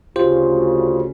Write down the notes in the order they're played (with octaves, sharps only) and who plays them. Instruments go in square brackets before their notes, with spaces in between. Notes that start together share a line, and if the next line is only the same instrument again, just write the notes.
[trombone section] D2 C#3 [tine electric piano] F4 G4 C5